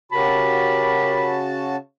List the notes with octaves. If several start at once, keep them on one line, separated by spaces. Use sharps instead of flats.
C#3 F#4 G4 A#4 A5 B5